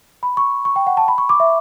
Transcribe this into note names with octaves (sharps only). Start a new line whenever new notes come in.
B5
C#6
C#6
G5
F#5
A5
B5
C#6
D6
E5